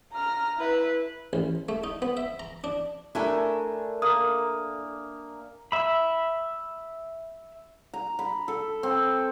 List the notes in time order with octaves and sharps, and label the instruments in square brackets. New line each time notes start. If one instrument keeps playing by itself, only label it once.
[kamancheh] A#5 F6
E4 B4
[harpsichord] A1
A3
D#4
B3
E5
A#5
D4
[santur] A3 D4 G#5 [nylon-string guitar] E4 A4 A#4
[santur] A#3 [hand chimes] D#6
[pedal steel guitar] E5 B5
[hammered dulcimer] A#5
B5
A4
C4